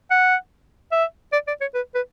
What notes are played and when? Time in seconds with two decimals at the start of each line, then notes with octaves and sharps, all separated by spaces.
0.11 F#5
0.92 E5
1.33 D5
1.48 D5
1.61 C#5
1.74 B4
1.95 B4